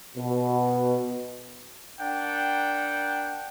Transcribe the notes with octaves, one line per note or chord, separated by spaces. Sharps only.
B2
D4 A#4 F#5 G5